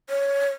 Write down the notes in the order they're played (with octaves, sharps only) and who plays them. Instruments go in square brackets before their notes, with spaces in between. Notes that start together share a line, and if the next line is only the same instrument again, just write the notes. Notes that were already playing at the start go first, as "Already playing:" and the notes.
[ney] C#5